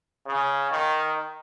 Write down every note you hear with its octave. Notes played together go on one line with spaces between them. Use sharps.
C#3
D#3